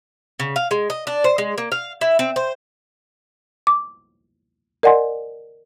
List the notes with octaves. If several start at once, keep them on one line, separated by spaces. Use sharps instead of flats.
C#3
F5
G#3
D#5
D4
C5
G#3
A#3
F5
E4
C4
C5
D6
A#4 D5 D#5 F#5 G#5 C6